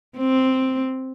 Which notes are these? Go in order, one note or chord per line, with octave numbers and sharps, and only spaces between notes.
C4